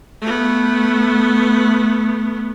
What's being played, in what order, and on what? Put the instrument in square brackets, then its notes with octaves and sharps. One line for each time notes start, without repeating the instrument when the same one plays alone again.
[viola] A3 B3